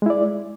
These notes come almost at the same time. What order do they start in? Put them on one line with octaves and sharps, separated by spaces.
G#3 E4 D5